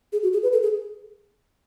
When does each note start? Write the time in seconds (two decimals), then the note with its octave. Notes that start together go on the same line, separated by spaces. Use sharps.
0.13 G#4
0.23 F#4
0.33 G#4
0.43 B4
0.53 A4
0.63 G#4